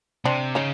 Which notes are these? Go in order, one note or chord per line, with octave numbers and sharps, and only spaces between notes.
C3 C4 D4
C#3 C#4 D#4